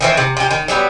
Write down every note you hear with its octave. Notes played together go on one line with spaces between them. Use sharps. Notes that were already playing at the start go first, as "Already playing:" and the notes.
D#3 E3 C4
C3
C3 G4
D#3
F#3 G3 A#3 B3